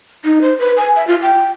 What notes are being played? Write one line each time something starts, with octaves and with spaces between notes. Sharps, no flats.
D#4
C5
B4
G#5
E5
F4
G5